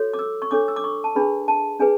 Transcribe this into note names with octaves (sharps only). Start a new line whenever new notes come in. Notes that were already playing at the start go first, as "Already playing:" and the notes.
Already playing: F#4 A4 C#5
D6
E6
C#6
D4 A4 C#5 D6
E6
D6
C#6
A5
D4 G#4 B4 B5
A5
D4 G#4 B4 G#5